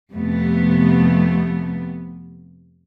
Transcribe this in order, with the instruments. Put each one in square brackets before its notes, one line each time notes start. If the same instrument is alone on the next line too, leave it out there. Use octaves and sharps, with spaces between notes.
[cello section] F2 C3 A3 B3